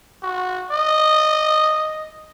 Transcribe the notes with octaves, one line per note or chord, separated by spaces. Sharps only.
F#4
D#5